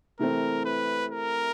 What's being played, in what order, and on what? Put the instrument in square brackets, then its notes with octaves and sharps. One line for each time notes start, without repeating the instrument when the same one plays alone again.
[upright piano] C3 E3 A3 C4 [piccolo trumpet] A#4
[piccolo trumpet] B4
A#4